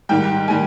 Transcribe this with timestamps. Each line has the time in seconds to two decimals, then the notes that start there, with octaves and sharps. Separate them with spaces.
0.09 G#2 D#3 G3 G5
0.48 D#3 G3 G#5